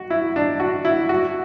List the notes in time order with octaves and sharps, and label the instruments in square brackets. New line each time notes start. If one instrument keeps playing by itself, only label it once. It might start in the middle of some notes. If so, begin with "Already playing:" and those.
Already playing: [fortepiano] F#4
E4
D4
F#4
E4
F#4